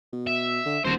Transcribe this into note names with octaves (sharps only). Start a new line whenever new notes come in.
B2
E5
D3
D#1 F#4 C5